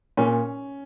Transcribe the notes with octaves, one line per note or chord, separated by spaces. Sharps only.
A#2 C#4